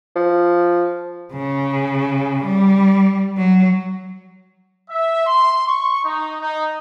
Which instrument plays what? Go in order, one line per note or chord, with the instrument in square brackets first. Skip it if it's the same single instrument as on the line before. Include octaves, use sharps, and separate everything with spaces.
[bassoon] F3
[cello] C#3
G3
F#3
[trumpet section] E5
C6
C#6
D#4
D#4